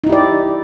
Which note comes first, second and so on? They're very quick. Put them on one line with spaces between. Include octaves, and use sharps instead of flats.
D#4 E4 G4 D5